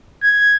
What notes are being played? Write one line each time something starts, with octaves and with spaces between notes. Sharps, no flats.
G#6